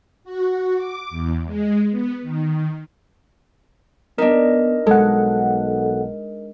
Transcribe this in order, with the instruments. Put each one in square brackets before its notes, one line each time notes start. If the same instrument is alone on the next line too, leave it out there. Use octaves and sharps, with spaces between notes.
[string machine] F#4
D6
E2
G#3
B3
D#3
[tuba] B3 [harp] D4 D#4 [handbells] A#4 D#5
[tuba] B1 [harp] G#3 [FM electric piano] A4 F#5